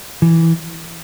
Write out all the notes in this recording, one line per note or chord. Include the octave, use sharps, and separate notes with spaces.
E3